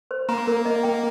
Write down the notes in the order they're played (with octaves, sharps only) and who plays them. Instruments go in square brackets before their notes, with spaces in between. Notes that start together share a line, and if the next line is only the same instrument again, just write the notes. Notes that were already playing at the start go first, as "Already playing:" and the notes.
[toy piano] C5
[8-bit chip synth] A#3 [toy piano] A#5
[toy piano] A#4
D#5
G5